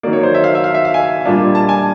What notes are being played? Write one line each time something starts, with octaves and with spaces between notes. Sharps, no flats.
D#3 F#3 A#3 D5
C#5
C5
E5
F5
E5
F5
E5
F5
G#5
A#2 G3 A#3 D4 F4
A5
G#5